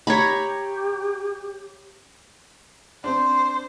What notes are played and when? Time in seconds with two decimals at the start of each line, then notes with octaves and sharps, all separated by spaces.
0.07 G4 C#5 A#5 B5
3.04 C4 D4 C5